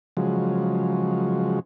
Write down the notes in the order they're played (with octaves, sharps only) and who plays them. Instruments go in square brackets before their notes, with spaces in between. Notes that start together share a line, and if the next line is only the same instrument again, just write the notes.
[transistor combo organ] C#3 F3 F#3 G#3